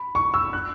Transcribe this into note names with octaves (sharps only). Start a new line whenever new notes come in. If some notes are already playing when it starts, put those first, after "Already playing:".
Already playing: B5
C#6
E6
F#6